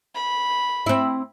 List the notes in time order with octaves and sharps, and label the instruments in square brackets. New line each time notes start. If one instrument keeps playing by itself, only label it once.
[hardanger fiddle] B5
[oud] C4 E4